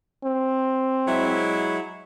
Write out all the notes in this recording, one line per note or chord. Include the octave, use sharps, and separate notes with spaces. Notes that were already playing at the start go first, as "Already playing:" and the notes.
C4
F#3 G#3 E4